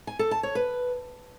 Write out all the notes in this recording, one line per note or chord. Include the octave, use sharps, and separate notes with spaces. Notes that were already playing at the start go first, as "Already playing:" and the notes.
G#5
A4
A5
C#5
B4